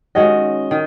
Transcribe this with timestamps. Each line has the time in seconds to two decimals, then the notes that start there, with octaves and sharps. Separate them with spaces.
0.15 D#3 G#3 C#4 F#4 D#5
0.71 D#3